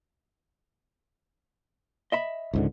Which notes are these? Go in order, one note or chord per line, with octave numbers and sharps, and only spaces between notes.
D#5 E5 B5
C#2 G#2 D3